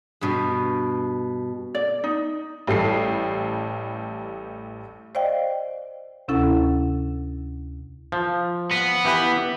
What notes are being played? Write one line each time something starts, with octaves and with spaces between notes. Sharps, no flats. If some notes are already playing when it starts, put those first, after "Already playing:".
G2 B2
D5
D#4
A1 G3 A4 C7
C5 D5 D#5 F5 G5
D2 C3 C#4 E4 A4 F#5
F3
B3
E3 G4 B4